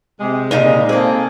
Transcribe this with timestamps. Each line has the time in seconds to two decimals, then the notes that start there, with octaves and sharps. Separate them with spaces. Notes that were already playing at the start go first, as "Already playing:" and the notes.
0.20 C3 G#3
0.51 A#2 C#3 D#4
0.89 A#3 C4 G#4 A4